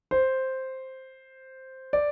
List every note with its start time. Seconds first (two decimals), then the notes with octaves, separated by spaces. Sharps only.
0.11 C5
1.93 D5